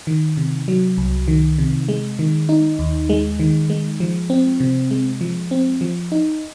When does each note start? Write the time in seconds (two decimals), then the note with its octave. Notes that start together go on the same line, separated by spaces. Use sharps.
0.07 D#3
0.37 C3
0.68 F#3
0.98 C2
1.28 D#3
1.59 C3
1.89 G#3
2.19 D#3
2.49 D#4
2.79 D#2
3.09 G#3
3.40 D#3
3.70 G#3
4.00 F3
4.30 C4
4.60 C3
4.91 G#3
5.21 F3
5.51 C4
5.81 F3
6.12 D#4